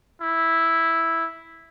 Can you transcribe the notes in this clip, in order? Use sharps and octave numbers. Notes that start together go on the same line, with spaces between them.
E4